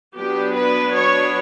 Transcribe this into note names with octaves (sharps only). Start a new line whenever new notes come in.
F#3 B3 D4 G4
B4
C#5